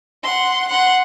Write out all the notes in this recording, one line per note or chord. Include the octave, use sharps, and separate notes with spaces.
F#5 C6
F#5 C6